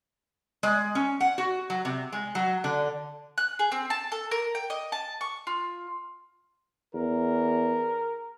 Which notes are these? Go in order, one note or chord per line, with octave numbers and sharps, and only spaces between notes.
G#3
C#4
F#5
F#4
F#3
C3
G#3
F#3
D3
F#6
G#4
C4
A5
A4
A#4
G5
D#5
A5
C#6
F4
E2 A#4